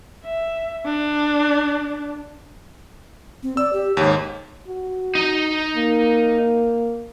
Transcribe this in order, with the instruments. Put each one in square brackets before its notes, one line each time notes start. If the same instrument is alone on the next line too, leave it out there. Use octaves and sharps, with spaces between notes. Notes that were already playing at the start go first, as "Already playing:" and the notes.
[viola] E5
D4
[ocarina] C4
[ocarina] D5 [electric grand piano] E6
[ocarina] G4
[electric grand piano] D#2 G#2 [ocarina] C#5
[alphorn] F#4
[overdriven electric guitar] D#4 D#5
[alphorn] A#3